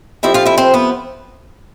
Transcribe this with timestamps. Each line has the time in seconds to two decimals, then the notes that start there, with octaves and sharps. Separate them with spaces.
0.23 C3 F3 A3 C4 E4 E5
0.34 F4 F5
0.45 E4 E5
0.58 C4 C5
0.74 B3 B4